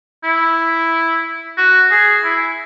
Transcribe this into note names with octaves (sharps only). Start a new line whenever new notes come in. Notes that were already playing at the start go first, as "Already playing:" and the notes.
E4
F#4
G#4
E4